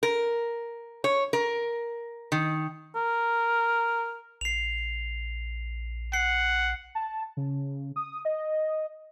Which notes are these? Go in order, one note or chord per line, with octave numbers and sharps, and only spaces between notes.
A#4
C#5
A#4
D#3
A#4
A#1 C7 F7
F#5 C7
A5
C#3
D#6
D#5